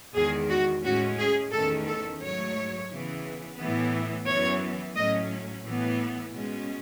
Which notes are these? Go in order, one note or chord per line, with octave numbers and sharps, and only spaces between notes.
E2 D#3 G#3 G#4
F#4
A2 G#3 C#4 F#4
G#4
E2 D#3 A3 C#4 A4
A4
G#2 F#3 A3 C#5
C#3 E3 B3
A2 E3 B3
F#2 E3 B3 C#5
A2 F#3 A3 C#4 D#5
A2 E3 B3
B2 G#3 C#4